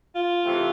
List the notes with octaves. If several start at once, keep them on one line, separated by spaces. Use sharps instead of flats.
F4
C3 E3 A3 C4